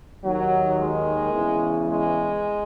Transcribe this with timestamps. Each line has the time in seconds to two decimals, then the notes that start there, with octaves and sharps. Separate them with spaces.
0.24 D#2 D#3 F#3
0.79 G#3
1.32 E2 C#3 E3
1.87 G#3